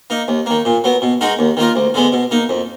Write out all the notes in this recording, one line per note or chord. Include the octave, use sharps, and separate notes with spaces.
A#3 D#4
D#2
D#3 A#3
A#2
F#3 B3
B2
G#3 D#4 F#4 A#4
D#2
D#3 A#3 F4 A#4
D2
D3 G#3 B3
B2
A#3 D#4
F2